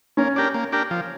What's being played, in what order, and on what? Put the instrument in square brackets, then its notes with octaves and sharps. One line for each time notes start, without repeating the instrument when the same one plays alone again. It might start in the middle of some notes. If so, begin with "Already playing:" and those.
[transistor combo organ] A#3 [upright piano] C#4
[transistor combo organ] D4 G4 A#4
A#3
D4 G4 A#4
F3